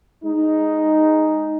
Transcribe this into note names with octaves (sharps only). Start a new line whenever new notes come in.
G#3 D#4